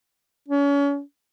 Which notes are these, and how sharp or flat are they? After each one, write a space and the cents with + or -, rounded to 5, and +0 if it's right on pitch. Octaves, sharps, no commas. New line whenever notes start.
C#4 +35